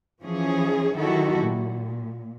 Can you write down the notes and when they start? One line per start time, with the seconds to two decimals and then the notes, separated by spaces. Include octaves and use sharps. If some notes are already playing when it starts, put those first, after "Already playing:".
0.23 E3 F3 C#4 G#4
0.97 D#3 F#3 E4 F#4 G4 A4
1.41 A#2